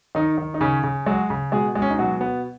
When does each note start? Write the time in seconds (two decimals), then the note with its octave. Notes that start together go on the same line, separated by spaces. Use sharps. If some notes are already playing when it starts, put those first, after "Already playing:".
0.15 D#3 D#4
0.38 D#3
0.54 D#4
0.61 C#3 C#4
0.83 C#3
1.06 F#3 G#3 F#4
1.30 C#3
1.52 B2 G#3 G#4
1.75 G#3
1.82 C#4
1.90 D#4
1.99 B2 F#3 F#4
2.21 B3